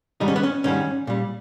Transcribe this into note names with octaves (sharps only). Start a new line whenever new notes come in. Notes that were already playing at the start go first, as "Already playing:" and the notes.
G#2 D#3 G3 D#4
C#4
B3
C#4
G#2 D#3 G3 C#4
A#2 G3